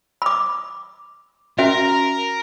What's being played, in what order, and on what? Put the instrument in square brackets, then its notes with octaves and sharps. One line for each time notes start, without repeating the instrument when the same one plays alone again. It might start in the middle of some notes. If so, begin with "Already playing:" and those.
[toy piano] B5 D6
[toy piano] C#4 F#4 E5 [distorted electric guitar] A#4